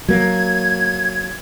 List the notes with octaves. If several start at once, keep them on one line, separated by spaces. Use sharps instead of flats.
F#3 A#3 G#6